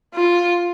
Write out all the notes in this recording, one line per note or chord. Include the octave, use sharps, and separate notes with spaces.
F4